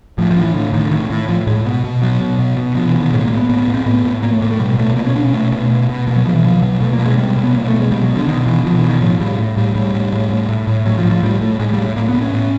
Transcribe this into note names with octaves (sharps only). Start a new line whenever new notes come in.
A2 F3
F3
A2
E3
A2 D3
A2 D#3
D3
A2 D#3
A2
A2 F3
A2 G#3
B2
B2
B2 F#3
B2
B2
B2
B2 F3
E3
B2
D#3
A2 G#3
A#3
A2
B3
A2 B3
B3
A2
C4
A2 B3
A2
A2 A#3
A3
A2 A#3
A3
B2 G3
B2 A3
B2 A#3
C#4
B2 D4
C#4
B2 A3
B2
B2
B2
B2 A#3
F#3
B2 F3
E3
B2 F3
F3
B2 F#3
B2 A3
A#3
B2
G#3
B2 G3
B2
B3
B2 A#3
A3
B2
G#3
B2 G3
F#3
B2
D3
B2 D#3
B2 E3
B2 F3
E3
B2
D#3
A2 F3
A2 G3
A2
A2 G3
A2 G3
A2
A2
A2
A2
A2
A2 F#3
F3
A2
F3
A2 G3
A2 A3
A2 G#3
G3
A2
A2 A#3
B3
A2
C#4
A2